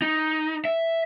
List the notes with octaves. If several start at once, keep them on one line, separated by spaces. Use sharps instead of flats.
D#4
E5